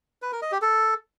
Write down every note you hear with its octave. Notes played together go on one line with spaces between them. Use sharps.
B4
A#4
D#5
G4
A4